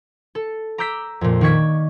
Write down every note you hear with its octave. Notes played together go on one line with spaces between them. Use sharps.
A4
A#5 D6 E6 G6 A#6 B6
F2 A#2
D#3 D5 C#6 G#6 B6